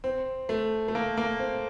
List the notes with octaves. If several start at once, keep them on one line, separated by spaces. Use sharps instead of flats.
C4
A3
A3
A#3
A#3
C4